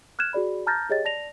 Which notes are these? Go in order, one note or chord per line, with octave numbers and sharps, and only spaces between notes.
F6 F#6 G#6 E7
F#4 G#4 D5 B5
A5 A#5 F6 G6 A6 A#6
G4 G#4 C#5 D#5 G5 A6
D5 A5 A#6 F7